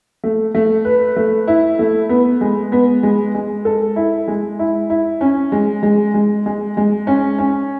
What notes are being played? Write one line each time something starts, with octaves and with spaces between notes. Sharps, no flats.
A3
A3
B4
A3
E4
A3
B3
G#3
B3
G#3
G#3
A4
E4
G#3
E4
E4
C#4
G#3
G#3
G#3
G#3
G#3
C#4
C#4